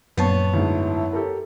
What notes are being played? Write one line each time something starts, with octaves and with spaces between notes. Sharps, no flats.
A#1 F#2 B3 C#5 A5 C7
D2 G#2 E4
G4 A4 A#4